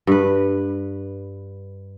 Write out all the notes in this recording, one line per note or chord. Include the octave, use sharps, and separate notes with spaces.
G2 B4